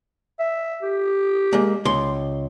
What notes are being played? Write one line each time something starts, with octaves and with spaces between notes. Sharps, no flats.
E5
G4
G#3 A#3
C#2 C6